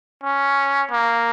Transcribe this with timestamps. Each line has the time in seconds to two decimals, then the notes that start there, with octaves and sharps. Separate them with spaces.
0.23 C#4
0.91 A#3